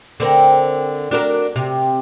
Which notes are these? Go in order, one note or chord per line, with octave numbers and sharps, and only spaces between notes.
D3 C4 A#4
D4 F#4 A#4
C3